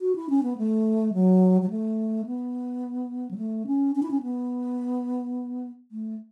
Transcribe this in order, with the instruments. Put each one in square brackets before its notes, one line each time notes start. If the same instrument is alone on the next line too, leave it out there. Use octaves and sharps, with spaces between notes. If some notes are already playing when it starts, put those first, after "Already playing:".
[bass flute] F#4
E4
C#4
B3
A3
F#3
F#3
A3
B3
F#3
A3
C#4
C#4
E4
C#4
B3
A3